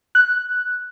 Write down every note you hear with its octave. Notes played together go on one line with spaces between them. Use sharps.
F#6